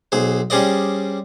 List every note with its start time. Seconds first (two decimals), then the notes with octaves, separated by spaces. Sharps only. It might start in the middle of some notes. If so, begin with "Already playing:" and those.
0.12 B1 G#4 C5
0.50 G3 C#4 G#4 C5 D5 D#5